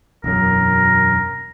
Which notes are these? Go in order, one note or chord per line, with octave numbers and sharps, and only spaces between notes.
E1 F#2 A#4